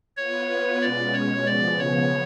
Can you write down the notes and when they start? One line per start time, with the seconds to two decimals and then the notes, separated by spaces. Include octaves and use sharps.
0.16 B3 F4 B4 C#5
0.82 B2 G#3 C#4 D5
1.13 C#5
1.46 C#3 F3 B3 D5
1.79 C#5